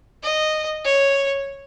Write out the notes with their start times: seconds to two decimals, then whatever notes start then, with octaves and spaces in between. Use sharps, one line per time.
0.23 D#5
0.85 C#5